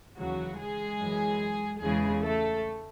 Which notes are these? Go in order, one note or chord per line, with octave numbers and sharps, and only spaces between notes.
D#2 C#3 E3 F#3 F#4
G#3 G#4
F#2 E3
E2 C#3 E3 G#3 G#4
A3 A4